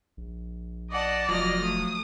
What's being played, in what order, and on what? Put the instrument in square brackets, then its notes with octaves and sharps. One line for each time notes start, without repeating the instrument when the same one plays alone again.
[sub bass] A#1
[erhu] D5 [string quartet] D#5 F#5 A5
[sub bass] F1 [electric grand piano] F3 F#3 [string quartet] D#5 F6 A#6
[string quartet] A3 [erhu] D#6